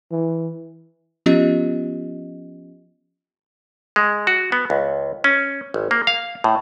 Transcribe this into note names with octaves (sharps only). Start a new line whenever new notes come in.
E3
F3 B3 C#4 F4 G4 D#5
G#3
F#4
B3
C#2
C#4
G#1
A#3
F5
A2